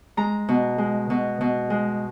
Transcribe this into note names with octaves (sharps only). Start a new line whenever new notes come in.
G#3 A#5
B2
G#3
B2
B2
G#3